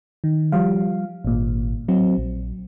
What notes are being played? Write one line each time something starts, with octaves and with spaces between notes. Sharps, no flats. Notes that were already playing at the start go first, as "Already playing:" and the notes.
D#3
F3 G3 F5
G#1 A#2
F#3 C4
A#1